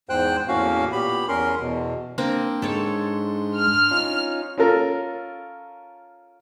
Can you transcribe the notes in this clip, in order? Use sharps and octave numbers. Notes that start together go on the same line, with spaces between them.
E2 G#2 C5 G5 F#6
E2 A2 A#3 C#4 F#4 F5
A#2 B3 G4 B5
E2 C#4 A#4 C6
E2 B2
A#3 C4 D4 C6
G#2 A4 C#5
F6
C#4 D#4 F4
C#4 F4 A4 A#4